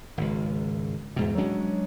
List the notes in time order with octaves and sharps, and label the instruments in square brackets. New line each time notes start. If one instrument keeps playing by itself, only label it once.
[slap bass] G#1 C#2
E2 G#2 B2
F#3 G#3 C#4 D4